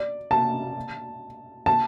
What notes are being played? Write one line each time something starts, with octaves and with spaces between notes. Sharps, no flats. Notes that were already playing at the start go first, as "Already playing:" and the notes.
Already playing: D5
A5
A5